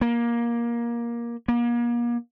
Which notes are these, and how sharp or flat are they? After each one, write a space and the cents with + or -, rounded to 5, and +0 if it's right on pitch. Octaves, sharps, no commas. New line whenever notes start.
A#3 +15
A#3 +35